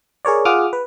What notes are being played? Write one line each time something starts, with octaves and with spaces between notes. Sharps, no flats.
G#4 A#4 C#5 D5
F4 G#4 F#5 D6 D#6 F6
B4